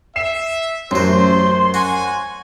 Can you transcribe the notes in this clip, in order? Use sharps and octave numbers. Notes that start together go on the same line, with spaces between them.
E5 C7 E7
A1 F#2 F#3 C5 C6
F#4 F#5 G#5